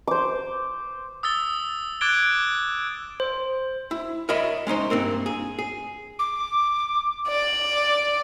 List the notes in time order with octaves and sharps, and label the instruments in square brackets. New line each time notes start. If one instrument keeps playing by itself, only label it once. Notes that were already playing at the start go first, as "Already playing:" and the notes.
[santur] C5 D6
[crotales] D#6 E6 A6 G7
D6 F#6 G#6 A6 D7 G7
[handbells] C5
[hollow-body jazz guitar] E4
A#4 C#5 D#5 E5 B5
G#3 C#4 D#4 C5
G2 A#3 C4 A#4
G#4
G#4
[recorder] D6
[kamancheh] D5